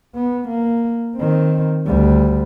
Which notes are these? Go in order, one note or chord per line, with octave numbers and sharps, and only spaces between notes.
B3
A#3
D#3 C4
D2 G3